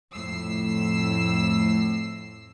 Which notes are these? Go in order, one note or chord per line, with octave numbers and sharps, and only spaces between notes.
F2 A2 E6 C7